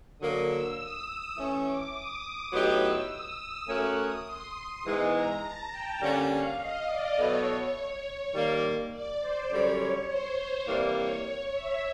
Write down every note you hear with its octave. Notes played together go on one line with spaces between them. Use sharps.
D3 F#3 A#3 D#6
E6
D#6
E3 A3 C#4 C#6
D6
D#6
D6
A2 F#3 B3 D#4 G4 E6
E6
D#6
A3 C#4 F#4 A#4 C#5 D6
D#6
C6
G#2 E3 G#3 B3 A#5
A#5
A5
G5
D3 G3 A#3 C#4 F#5
F5
D#5
D5
B2 F#3 B3 E4 A4 C#5
C#5
D#3 G3 A#3
D5
C5
F#2 D3 G3 C#5
C5
C#5
C3 E3 G3 A#3 D5
C#5
C#5
E5